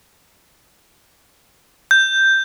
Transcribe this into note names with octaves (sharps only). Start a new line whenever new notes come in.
G6